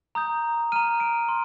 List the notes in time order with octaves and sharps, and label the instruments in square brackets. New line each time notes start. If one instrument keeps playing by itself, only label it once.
[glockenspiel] A#5 D#6 G6
A#5 F6 D#7
D7
C6